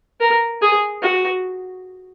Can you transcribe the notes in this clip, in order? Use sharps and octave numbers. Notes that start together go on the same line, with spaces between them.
A#4
G#4
F#4